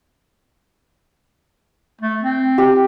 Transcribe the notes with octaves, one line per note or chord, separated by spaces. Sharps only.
A3
C4
G4